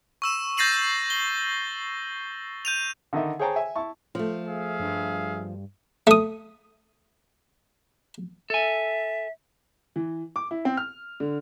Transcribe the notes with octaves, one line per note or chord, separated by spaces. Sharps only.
C#6 E6 E7
G6 A6 A#6 C7 D#7 F#7
G7
G6 D#7 F7
D3 D#3 D#4 D#5 E5
G#4 C5 C#5 G5 A5 A#5
E5 G#5
E4 A5 C#6
F3 A3
G#4 E5 F5
G2
A3 D#6
A4 E5 G#5
E3
D6
E4
C4
F6
D3